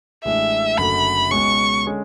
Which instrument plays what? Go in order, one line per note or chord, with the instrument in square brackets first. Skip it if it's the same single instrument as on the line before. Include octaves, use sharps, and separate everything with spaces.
[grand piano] A1 A2 E3 G#3 D4 [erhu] E5
[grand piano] F#1 F#2 D3 A3 [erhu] B5
[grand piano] C#2 B2 G#3 C#4 [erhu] C#6
[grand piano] D3 G#3 C#4